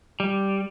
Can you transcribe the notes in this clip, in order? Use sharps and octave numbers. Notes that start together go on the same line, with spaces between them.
G3